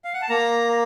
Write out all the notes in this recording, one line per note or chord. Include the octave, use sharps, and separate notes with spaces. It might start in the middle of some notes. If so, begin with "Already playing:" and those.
F5
F#5
A5
A#3 A#5